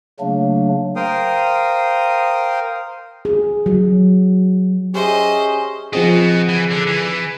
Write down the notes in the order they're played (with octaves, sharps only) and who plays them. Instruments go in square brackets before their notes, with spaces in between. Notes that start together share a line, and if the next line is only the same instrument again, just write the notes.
[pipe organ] C#3 F#3 A3 A#3 D4
[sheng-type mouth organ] A#4 C5 F5 G5 D#6
[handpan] G#4
F#3
[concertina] C#4 [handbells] G4 G#4 E5 [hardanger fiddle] C5 D#5
[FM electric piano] F3 C4 G#4 [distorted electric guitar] F#4 D#5
[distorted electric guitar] E3
D3
E3